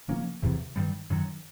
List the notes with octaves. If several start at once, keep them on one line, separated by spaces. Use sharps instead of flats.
C#3 F3 A#3 C#4
E2 C3 E3
G2 D#3 G3
F#2 D#3 F#3